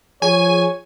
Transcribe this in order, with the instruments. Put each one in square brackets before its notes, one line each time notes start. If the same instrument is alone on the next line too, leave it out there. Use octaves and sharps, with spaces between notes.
[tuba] F3 [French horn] G#4 [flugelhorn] C#5 [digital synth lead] G#5